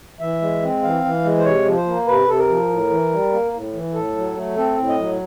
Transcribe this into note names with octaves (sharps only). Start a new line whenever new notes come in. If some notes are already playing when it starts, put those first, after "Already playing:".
E3 E5
G#3
C4
E3 F5
E3
G#3
C5
C3 C#5
F3
C5
A#3
C3 B4
C3 A4
A#4
F3
A2
E3
G3
A#3
A2
E3
A2 A4
F#3
A3
C4 A4
A2
D#5
F#3